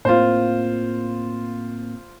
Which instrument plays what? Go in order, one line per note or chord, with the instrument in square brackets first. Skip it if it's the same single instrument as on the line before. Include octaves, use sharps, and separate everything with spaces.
[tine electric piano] A2 A#3 C4 [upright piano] F4 C5